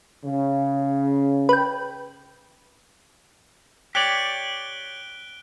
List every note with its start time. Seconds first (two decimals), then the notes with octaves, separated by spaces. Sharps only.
0.25 C#3
1.49 B4 G5
3.95 G4 C#5 D5 F#6 D7 G7